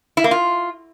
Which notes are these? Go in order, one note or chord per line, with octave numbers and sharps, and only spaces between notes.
E4
A#3
F4